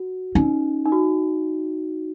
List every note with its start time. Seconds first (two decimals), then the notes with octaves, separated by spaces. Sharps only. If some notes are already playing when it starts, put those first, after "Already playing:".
Already playing: F#4
0.35 C#4 D#4
0.85 D#4
0.92 F#4